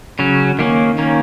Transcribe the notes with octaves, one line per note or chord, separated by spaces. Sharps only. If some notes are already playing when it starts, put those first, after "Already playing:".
C#3 F#3 C#4
D#3 A#3 C#4
D#3 A#3 C#4